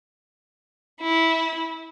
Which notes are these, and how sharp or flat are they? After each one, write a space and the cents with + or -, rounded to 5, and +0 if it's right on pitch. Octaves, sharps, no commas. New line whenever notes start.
E4 -15